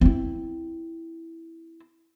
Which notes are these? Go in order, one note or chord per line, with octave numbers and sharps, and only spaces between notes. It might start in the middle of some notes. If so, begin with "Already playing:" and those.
C4 E4